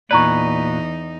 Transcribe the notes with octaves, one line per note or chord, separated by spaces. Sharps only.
E2 A#2 D#4 B4 D5 A#5 C#6